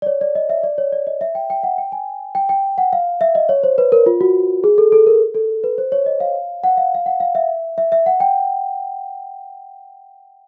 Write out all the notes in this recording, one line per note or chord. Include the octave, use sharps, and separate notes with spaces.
D5
C#5
D5
D#5
E5
D5
C#5
D5
D#5
E5
G5
G5
F#5
G5
G#5
G5
G5
F#5
F5
E5
D#5
C#5
C5
B4
A#4
F4
F#4
G#4
A4
A4
A#4
A4
B4
C5
C#5
D#5
F5
F#5
F5
F5
F#5
F5
E5
E5
E5
F#5
G5